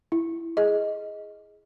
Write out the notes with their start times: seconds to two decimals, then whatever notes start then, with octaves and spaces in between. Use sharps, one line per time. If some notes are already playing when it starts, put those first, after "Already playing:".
0.12 E4
0.57 G#4 D#5